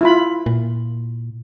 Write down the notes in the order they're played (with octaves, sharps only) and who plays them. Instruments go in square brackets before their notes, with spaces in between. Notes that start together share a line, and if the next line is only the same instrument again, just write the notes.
[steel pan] E4 F4 B5
[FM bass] A#2